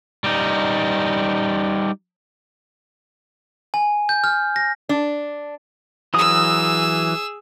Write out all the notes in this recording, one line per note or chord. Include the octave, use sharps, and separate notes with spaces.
G3 D#4
G#5
G6
F6
A#6
D4
E3 F#3 G#4 D#6 E6